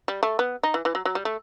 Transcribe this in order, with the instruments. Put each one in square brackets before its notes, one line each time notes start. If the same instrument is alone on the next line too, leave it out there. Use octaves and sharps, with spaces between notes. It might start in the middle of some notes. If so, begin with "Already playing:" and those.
[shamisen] G3
A3
B3
D#4
E3
E3
F#3
F#3
G3
A3